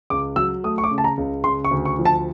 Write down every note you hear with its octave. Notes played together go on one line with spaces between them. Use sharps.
C#2 D6
F#3 E6
A3 D#6
C#6
D6
C#3
A5
A#5
C#2
C#3 C6
C#6
D2
C#6
F3
A5